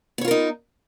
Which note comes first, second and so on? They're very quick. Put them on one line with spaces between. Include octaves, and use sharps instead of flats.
B3 C#5 F4 A#4 D#4